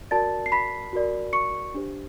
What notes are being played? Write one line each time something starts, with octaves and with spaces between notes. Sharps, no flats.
F#4 A#4 D5 A5 A6
C7
B5 B6
F#4 A#4 D5
C#6 C#7
D4 G4 C5